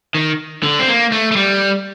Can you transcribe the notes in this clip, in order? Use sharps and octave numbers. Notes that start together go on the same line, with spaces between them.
D#3
D3
C4
A#3
A3
A3
G3